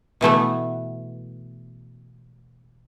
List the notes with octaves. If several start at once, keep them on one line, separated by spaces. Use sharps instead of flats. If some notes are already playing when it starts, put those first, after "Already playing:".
B2 E3 A3 B3